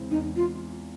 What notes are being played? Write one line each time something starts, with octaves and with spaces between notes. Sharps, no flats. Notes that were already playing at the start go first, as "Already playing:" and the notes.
Already playing: E2 C#3 E3 G#3 C4
E2 D#4
F4